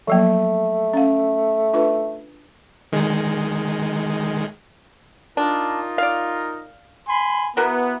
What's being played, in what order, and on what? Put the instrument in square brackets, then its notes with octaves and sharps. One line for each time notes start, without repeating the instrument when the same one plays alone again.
[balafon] F3 F#3 A#3 [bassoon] A3
[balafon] C#4 F5
D4 F4 B4
[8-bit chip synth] D#3 G#3
[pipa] D4 [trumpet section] D#4 F4 A#4
[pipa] D5 F5
[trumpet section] G#5 B5 C6
[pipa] E3 F#4 A#4 [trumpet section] B3